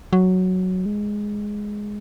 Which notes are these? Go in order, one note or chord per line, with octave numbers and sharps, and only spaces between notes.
F#3
G#3